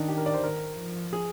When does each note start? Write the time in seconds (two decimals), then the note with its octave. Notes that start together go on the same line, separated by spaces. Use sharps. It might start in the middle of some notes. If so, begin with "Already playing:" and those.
Already playing: D#3 D4 D#4
0.08 G4
0.17 A#4
0.26 D5
0.34 C5
0.43 D#3 A#4
0.77 F3
1.13 G#4